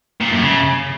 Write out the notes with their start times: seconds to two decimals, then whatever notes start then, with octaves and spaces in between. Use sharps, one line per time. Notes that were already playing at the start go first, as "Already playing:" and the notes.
0.21 A#2
0.31 F#2
0.42 C#3